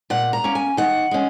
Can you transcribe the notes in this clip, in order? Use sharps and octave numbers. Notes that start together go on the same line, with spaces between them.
A#2 F#5
A#5
A#3 C#4
G#5
D#3 F#5
G#3 C#4